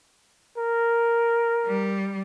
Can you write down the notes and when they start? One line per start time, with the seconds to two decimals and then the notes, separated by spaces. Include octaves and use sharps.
0.58 A#4
1.66 G3